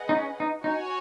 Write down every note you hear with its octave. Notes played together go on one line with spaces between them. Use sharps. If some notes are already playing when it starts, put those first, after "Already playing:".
Already playing: G#4 B4 D#5 F#5
D#4
C#4
D#4
D#4 F#4 C#5 G#5